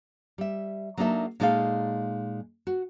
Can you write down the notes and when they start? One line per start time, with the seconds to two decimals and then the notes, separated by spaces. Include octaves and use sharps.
0.38 G3 E5
0.97 F#3 A#3 D4 D#4 A4 E5
1.40 A#2 G#3 D#4 A4 C5 F5
2.67 F#4